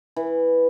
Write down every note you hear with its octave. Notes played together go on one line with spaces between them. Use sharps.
E3